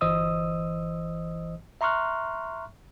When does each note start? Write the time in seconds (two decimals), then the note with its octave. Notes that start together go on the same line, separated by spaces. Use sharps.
0.01 G1 E3 C5 D#5 D#6 E6
1.81 E5 A#5 C6 C#6 F6 F#6